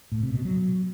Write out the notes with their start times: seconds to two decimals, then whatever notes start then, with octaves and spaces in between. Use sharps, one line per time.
0.12 A2
0.23 C3
0.34 B2
0.45 F#3